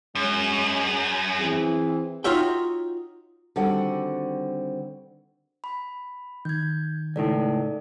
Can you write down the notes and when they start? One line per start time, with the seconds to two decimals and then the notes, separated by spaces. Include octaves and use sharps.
0.15 F#2 G#3 C#4
1.37 E3 C4 G#4
2.24 D#4 F4 F#4 C#5 E5 G5
3.56 D3 D#3 G3 C4 F#4 F#5
5.64 B5
6.45 D#3 G6 G#6
7.16 C#2 A2 D#4 A4 D5